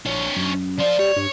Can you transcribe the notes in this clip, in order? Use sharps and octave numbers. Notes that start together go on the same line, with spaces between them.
A#1 D4 C#5
F#2
F3 C5 D5
G3 C#5
G2